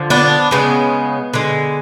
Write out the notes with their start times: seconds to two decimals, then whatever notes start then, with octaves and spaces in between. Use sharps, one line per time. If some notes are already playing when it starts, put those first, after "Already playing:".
Already playing: D3 F3
0.10 B3 D4
0.51 C#3 G#3 B3
1.34 D3 G#3